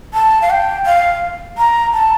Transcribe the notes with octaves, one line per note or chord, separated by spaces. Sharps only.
A5
F5
G5
F5
A#5
A5